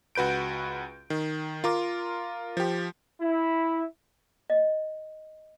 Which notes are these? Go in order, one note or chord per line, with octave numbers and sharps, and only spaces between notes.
C#2 F#4 B4 G6 D7
D#3
F4 A#4 D6
F3 G4
E4
D#5